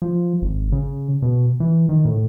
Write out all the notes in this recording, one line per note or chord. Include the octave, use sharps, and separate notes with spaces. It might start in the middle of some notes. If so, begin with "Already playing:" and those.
F3
G#1
C#3
B2
E3
D#3
A2